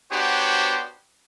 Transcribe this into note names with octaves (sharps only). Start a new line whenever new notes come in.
B3 D4 F#4 G4 C5 C#5